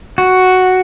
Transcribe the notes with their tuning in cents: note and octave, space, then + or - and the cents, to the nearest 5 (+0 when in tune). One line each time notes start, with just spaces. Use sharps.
F#4 +0